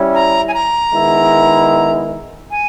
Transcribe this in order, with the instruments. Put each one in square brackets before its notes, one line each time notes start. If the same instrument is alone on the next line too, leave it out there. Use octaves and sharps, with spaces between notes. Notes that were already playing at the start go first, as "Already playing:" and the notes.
Already playing: [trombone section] G3 C#4 E4
[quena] A#5
G#5
A#5
[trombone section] D#3 G#3 B3 E4
[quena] G#5